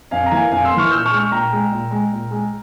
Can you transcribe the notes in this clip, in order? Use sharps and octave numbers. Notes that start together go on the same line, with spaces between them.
F2 F5 G#5
A#5
E3 A#3 F5 G#5
F2 F5 G#5
C6 E6
A#3
E3 C#6 F6
A#2 E6 G6
C#6 F6
G#3
C#6 F6
A#2 G5 A#5
G#3
A#2
G#3
A#2
G#3